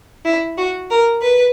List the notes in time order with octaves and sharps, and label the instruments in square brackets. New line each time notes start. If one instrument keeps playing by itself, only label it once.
[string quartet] E4
F#4
A#4
B4